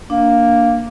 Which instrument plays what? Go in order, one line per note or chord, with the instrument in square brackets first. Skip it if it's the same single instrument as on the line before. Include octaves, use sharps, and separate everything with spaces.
[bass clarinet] A#3 [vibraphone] D4